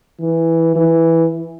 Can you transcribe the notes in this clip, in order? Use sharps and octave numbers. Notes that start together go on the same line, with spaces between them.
E3
E3